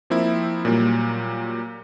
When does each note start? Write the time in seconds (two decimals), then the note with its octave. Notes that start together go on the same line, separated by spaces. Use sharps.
0.10 F3 A#3 C4 E4
0.65 A#2 F#3 G3 A#3